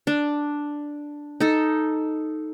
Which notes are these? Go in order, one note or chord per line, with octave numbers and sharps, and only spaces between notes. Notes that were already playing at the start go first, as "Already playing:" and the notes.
D4
D#4 A4